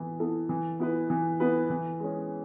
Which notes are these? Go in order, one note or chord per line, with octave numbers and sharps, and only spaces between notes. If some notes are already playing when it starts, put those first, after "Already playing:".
Already playing: E3 B3 E4
B3 E4 A4
E3
B3 E4 B4
E3
B3 E4 B4
E3
G#3 C#4